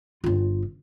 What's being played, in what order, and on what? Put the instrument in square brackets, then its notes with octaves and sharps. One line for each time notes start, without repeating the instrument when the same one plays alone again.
[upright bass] G1 F4